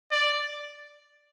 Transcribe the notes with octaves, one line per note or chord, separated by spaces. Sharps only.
D5